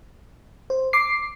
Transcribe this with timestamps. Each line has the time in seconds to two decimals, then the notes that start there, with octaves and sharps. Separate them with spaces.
0.70 C5
0.93 D6 C7